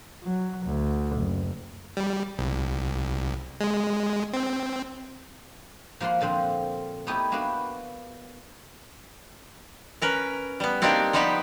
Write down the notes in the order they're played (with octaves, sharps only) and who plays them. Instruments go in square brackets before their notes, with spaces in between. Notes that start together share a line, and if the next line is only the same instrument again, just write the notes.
[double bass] F#3
D2
F#1
[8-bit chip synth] G3
C2
G#3
C4
[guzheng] F3 A#3 F4 F#5 C6
A#2 D3 F3 C4
A3 B3 D#4 E4 G4 A4
A#3 B3 D4 F#4 B4
[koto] C#4 A#4 B4
G3 B3
A#3 C4 D4 D#4 G4 D5
F3 G3 B3 D#4 G4 B4